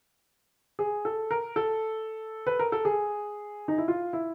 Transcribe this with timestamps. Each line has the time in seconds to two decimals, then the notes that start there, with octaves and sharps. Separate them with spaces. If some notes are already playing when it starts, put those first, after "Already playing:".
0.79 G#4
1.05 A4
1.31 A#4
1.56 A4
2.47 B4
2.59 A#4
2.72 A4
2.85 G#4
3.68 D#4
3.78 E4
3.88 F4
4.13 E4